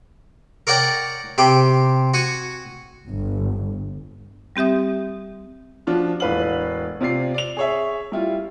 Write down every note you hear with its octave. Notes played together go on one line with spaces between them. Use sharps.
A#4 C#5 D5 F#5 G5 A#5
C3 G4 G5 B5
F#4 G#5 C#6
G1
G3 C4 G4 E5 D#6
F3 D4 F4 F#4
E1 A2 B4 F5 F#7
C3 F4 D5 C7
D5 F7
G#4 C#5 E5
G3 E4 F4